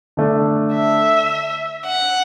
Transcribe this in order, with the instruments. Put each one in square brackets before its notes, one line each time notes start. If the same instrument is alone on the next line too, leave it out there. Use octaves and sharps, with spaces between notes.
[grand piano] D3 A3 D4
[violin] E5
F#5